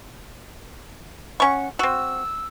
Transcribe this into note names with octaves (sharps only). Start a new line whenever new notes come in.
C#4 F#5 C#6
C4 F#4 E6